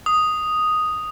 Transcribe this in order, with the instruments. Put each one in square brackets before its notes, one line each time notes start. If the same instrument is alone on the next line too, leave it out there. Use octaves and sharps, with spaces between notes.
[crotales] D#6